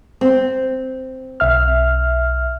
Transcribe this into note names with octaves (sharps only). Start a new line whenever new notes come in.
C4
B1 E5 F6